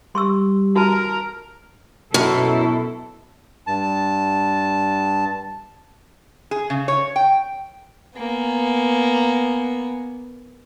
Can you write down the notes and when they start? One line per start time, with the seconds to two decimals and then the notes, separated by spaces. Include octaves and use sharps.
0.15 G3 C6 C#6 E6
0.76 F#4 A#4 A5
2.14 F#2 B2 E4 A4
3.67 G2 A5
6.51 G#4
6.70 C#3
6.88 C#5
7.16 G5
8.17 A#3 B3 G#5